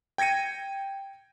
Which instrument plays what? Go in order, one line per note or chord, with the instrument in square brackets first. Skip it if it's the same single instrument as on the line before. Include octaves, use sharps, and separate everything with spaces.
[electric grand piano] G5 G#6 A#6 C#7 D#7